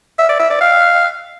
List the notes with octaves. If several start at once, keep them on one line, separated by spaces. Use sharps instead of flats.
E5
D5
E5
D5
F5